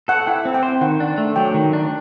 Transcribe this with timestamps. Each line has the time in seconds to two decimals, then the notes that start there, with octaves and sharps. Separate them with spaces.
0.08 A4 F#5
0.27 E4 G5
0.45 C4
0.54 G5
0.63 C5
0.81 D#3 F#5
1.00 D4
1.18 A3
1.36 F#3 G5
1.54 D#3
1.73 D4